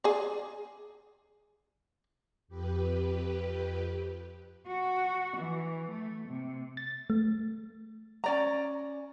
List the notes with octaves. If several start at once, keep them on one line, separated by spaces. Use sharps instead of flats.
G#4 D5
F2 G4 B4
F#4
E3
A3
C3
A6
A3
C#4 D5 A#5